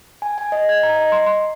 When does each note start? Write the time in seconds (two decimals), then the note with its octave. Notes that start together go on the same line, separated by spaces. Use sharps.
0.22 G#5
0.38 G#5
0.52 D#5
0.69 G#6
0.83 A#5
0.96 D#5
1.12 C6
1.26 C6